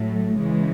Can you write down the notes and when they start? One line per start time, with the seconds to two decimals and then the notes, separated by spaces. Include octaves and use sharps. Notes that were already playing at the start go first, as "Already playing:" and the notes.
Already playing: A2 F#3 A3
0.37 C#3 E3 G#3